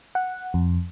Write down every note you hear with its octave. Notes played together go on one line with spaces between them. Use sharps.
F#5
F2